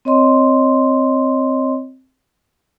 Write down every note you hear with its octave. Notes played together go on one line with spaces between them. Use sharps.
C4 C#5 D#5 C6